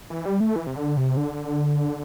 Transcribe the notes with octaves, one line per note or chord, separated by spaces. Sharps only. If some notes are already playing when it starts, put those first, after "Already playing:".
E3
G3
A3
E3
C3
D3
C3
D3